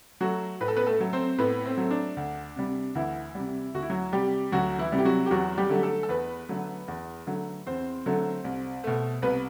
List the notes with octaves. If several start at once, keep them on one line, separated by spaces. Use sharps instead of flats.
F#3 A3 F#4
A2 B4
A4
B3 B4
A3 A4
F#3 A3
C4 C5
A2 B3 B4
C4
F#3 A3
D4
D2
C3 G3
D2 E3 E4
C3 G3
D2 F#4
E4
F#3 F#4
C3 G3 G4
D2 F#3 F#4
E3 E4
C3 G3
G4
F#3 F#4
G4
E2 F#3 F#4
G3 G4
D3 F#3 A3
A3 A4
A4
E2 B3 B4
D3 F#3 A3
E2
D3 F#3 A3
E2 C4 C5
D3 F#3 A3
C2
B2 A3
C2 B3 B4